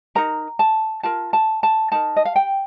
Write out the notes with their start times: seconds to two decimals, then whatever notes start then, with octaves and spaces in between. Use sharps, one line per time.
0.15 D#4 A#4 A#5
0.59 A5
1.03 F4 A#4 A5
1.33 A5
1.63 A5
1.92 D#4 A#4 A5
2.16 D#5
2.25 F5
2.36 G5